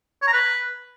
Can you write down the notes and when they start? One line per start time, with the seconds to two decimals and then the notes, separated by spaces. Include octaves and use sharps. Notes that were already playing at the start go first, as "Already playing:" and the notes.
0.22 C#5
0.28 A#5
0.33 B4